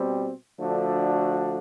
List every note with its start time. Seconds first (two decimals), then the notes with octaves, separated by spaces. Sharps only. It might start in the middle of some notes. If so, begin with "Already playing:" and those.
Already playing: B2 G3 C4
0.60 D3 F3 A3 D4 F#4